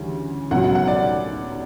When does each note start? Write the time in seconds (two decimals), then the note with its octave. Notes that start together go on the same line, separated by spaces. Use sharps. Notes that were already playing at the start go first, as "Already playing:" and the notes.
Already playing: D2 C#3 E3 G3
0.51 C#2 B2 F#3 F#5
0.64 F#5
0.75 F#5
0.88 D5